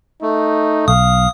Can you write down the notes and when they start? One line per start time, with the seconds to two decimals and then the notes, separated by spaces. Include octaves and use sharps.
0.22 A3 D#4
0.88 B1 F5 D#6